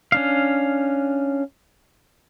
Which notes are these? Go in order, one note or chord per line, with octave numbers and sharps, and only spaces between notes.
C#4 D4 F5